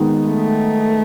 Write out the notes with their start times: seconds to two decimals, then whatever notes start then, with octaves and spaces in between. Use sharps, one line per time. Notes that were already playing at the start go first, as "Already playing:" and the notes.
Already playing: D#3 G#3 B3 D#4
0.28 A3